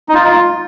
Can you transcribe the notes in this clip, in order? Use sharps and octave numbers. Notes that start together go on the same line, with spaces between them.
D#4
F4